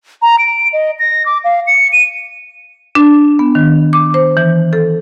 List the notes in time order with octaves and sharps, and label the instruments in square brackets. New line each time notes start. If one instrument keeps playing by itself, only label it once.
[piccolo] A#5
D7
D#5
A#6
D6
F5
C#7
D#7
[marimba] D4
B3
D#3
D6
C5
E3
A4